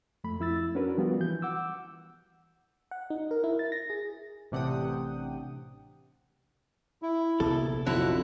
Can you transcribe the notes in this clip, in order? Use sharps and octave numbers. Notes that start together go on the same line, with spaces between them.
F2 A3 B5
F2 E4 E6 A6
C#4 D4 F#4 A#4 B4
F3 G3 B3 F4 F#4
E3 G6
F#5 D6 E6
F#5
D#4
A#4
E4
A6
A#6
G#4
A1 C3 D4 F#5 G5 D#6
E4
A#1 C3 B3 A4
F2 D3 F#3 E4 F#6